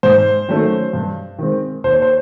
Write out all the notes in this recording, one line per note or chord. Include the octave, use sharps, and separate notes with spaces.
G#2 C5
D#3 F#3 A3 C#4
G2
D#3 G#3 C4
D#2 C5
C#5
C5